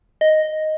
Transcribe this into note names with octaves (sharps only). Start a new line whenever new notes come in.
D#5